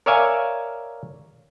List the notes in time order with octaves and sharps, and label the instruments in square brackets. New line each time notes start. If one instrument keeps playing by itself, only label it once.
[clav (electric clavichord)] A#4 C#5 D5 E5 F5 G#5